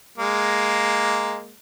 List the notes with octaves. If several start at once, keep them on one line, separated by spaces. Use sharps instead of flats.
G#3 A#3